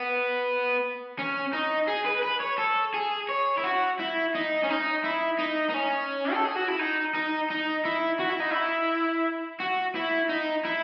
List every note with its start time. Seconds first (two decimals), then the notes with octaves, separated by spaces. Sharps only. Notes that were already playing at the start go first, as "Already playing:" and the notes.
Already playing: B3
1.19 C#4
1.53 D#4
1.88 G#4
2.06 B4
2.23 B4
2.41 C#5
2.59 A4
2.94 G#4
3.29 C#5
3.58 E4
3.64 F#4
3.99 E4
4.35 D#4
4.63 C#4
4.70 D#4
5.04 E4
5.39 D#4
5.69 D#4
5.74 C#4
6.33 A4
6.45 G#4
6.55 F#4
6.68 E4
6.79 D#4
7.14 D#4
7.50 D#4
7.85 E4
8.20 F#4
8.30 E4
8.40 D#4
8.51 E4
9.60 F#4
9.95 E4
10.30 D#4
10.65 E4